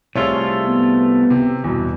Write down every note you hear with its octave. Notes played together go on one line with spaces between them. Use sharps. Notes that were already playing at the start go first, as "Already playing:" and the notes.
C2 A3 F4 G#4 A4 C#5
B3
C3
E2 G2 B2